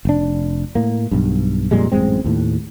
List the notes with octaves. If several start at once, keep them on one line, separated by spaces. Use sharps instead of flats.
F1 D4
A2 A#3
B1 G2
F2 A#2 G3 G#3
A1 F#2 G#3 C4
D#2 A2